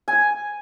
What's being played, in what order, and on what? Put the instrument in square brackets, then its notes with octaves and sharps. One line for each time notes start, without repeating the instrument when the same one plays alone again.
[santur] G#5